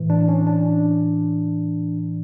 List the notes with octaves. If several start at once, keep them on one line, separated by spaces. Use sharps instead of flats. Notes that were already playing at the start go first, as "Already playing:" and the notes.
Already playing: A2 E3
D4
C#4
D4